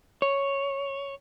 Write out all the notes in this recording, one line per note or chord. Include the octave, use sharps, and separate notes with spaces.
C#5